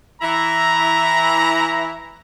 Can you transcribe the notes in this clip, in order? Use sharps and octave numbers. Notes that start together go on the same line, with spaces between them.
E3 E4 A#5